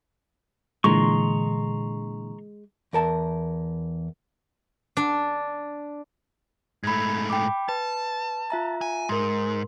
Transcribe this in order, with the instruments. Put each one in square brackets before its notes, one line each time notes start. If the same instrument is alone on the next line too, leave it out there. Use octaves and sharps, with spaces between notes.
[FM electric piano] A#2 D3 E3 [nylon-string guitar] G#3 [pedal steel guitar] A#5 C6 C#6
[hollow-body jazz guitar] E2 A#4 A5
[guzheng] D4
[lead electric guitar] G#2 A3 [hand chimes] B5 G#6
[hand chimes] G5 B5 D6
[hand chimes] B4 [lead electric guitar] A5
[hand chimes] F4 E5 A#5
[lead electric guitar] G#5
[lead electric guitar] G#2 [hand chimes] A#4 C6